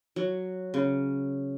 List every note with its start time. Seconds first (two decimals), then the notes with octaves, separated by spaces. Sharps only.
0.16 F#3
0.74 C#3